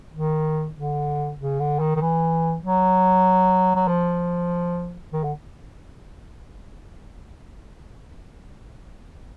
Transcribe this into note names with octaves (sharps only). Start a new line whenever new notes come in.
D#3
D3
C#3
D3
D#3
D#3
E3
F#3
F#3
F3
D#3
D3